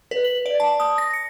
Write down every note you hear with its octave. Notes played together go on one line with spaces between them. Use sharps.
B4
F#7
D5
A5
D#6
A#6
C#7